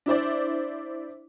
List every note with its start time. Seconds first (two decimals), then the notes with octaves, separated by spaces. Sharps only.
0.06 D4 E4 C5 D5